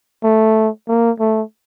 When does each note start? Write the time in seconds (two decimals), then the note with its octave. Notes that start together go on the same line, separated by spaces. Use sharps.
0.24 A3
0.88 A#3
1.20 A3